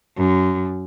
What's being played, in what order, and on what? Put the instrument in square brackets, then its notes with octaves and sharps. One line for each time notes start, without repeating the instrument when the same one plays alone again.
[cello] F#2